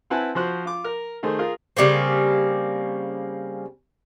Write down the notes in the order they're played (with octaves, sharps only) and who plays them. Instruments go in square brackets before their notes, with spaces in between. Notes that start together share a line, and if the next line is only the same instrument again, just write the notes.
[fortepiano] C4 E4 B4 F#5 G#5 A5
F3 F#4 C5 F#6
F4 D6
A#4
D#3 A3 G#4 C5
F4 G#4 A#4
[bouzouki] C#3 G3 A#3 C4